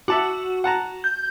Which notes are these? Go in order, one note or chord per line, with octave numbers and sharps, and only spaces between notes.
F#4 E5 A5 D6
F#5 A5 A#5
G6